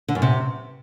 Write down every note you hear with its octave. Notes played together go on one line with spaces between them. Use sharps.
D3
F#2
C3